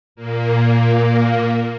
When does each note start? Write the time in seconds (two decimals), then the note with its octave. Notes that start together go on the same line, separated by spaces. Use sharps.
0.16 A#2 A#3